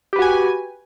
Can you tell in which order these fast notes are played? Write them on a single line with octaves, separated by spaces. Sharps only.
G4 B4 F#4 G#5